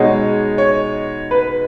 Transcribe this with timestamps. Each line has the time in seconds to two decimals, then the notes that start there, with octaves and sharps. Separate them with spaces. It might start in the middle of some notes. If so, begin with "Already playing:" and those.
Already playing: B2 G#3 D#4 C#5
0.58 C#5
1.31 B4